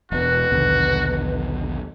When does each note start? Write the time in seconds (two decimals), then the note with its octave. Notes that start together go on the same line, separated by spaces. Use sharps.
0.12 E1 B2 F#4 B4
0.52 A#1 D#2 B2 D3